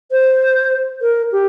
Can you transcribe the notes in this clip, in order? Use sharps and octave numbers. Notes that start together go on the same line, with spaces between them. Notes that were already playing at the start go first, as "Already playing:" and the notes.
C5
A#4
G4